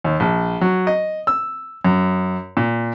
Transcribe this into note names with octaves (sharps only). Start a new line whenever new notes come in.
D#2
A#1
F#3
D#5
E6
F#2
A#2